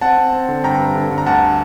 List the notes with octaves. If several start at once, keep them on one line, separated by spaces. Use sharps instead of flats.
C4 F#5 A5
C4
C4
D3
G2 G5 A#5
G2
D3
G2
A#5
D2 F#5 A5